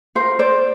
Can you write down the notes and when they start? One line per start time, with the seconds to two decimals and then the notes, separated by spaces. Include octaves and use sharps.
0.15 F4 A#4 C5
0.39 C5 D5